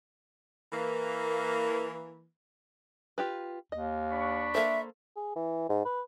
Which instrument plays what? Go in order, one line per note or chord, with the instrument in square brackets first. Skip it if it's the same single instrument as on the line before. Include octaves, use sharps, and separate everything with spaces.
[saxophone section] E3 A#3
[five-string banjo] F4 G4 B4
[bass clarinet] D#2 [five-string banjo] D#5
[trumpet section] D4 B5 C#6
[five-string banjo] A#3 A4 C5 [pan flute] E5
[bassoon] G#4
E3
G#2
B4